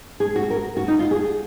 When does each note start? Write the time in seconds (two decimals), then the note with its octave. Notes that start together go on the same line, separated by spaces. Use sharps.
0.20 G#4
0.36 F#4
0.50 A#4
0.77 F#4
0.88 D#4
0.99 F4
1.11 G#4